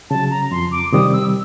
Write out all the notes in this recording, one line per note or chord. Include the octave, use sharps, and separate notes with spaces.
C#3 F#3 A5
A#5
F2 C6
D6
C3 D#3 G3 D#6
E6